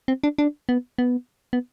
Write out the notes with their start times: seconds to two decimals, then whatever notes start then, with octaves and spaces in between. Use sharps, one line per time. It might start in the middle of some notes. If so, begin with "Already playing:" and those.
0.08 C4
0.24 D4
0.38 D4
0.69 B3
0.98 B3
1.53 B3